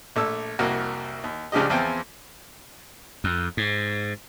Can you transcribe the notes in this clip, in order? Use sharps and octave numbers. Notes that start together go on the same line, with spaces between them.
A#1 A3 A5 E6
C2 F2 A#3 F#4
D#2
C#2 C#3 F3 D4 G4 D#5
E2 E3 F3 C4 F4 G5
F2
G#2